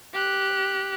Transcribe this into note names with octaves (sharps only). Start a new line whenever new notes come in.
G4 F#6